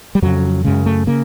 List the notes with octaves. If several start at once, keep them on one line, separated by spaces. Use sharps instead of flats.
G3
F2 C#3 F#3
F#2 C#3 G#3
A3
C#3 A#3